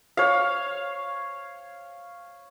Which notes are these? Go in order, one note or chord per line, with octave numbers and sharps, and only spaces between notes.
C#5 F5